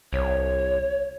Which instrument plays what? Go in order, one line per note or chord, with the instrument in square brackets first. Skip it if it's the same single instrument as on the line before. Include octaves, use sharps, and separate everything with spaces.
[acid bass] C2 [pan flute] C#5